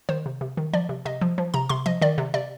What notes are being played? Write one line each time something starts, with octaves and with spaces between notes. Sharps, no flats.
D#3 C5
C3
C3
D#3
F3 D5
C3
C3 D#5
F3
F3
C3 A#5
C3 C6
F3 D#5
D#3 D5
C3
C3 D5